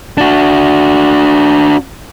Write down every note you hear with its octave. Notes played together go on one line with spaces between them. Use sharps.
D4 F#4